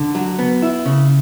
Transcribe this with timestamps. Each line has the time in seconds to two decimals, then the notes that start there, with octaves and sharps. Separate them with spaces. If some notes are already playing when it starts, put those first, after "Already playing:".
Already playing: D3
0.15 F#3
0.39 B3
0.62 E4
0.86 C#3